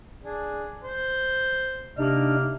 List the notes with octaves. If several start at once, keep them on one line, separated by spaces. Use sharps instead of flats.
D4 G#4
C5
C3 A#3 D4 D#4 F6